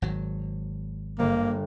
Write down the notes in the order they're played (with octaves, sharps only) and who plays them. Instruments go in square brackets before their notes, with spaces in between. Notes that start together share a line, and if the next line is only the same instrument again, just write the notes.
[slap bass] G#1 F#3
[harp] G1 G3 [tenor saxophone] A#3